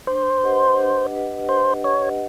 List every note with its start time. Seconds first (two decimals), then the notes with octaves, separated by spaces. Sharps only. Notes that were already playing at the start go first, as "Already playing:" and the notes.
0.07 D4 C5
0.43 G4 B4 D#5 F#5
0.79 D4
1.14 G4 B4 D#5 F#5
1.49 D4 C5
1.84 G4 B4 C#5 D#5 F#5